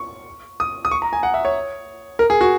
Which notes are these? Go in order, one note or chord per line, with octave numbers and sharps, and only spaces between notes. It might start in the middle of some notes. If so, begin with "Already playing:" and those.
Already playing: C#6
D#6
D#6
C#6
A#5
G#5
F#5
E5
C#5
A#4
G#4
F#4